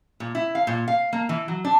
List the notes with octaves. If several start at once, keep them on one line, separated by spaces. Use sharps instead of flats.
A#2
E4
F5
A#2
F5
A#3
E3
F#3
D4